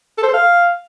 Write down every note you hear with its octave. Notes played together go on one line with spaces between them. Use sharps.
A4
C5
A4
F5